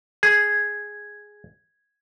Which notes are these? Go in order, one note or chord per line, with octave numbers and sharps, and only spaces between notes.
G#4 G#6